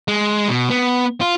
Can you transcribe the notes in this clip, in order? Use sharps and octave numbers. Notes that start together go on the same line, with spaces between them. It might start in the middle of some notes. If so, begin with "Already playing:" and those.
G#3
B2
B3
F4